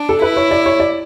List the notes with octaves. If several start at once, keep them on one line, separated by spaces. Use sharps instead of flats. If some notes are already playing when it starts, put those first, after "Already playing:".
Already playing: D4
A4
E4 B4
C#5
D5
C#5
D5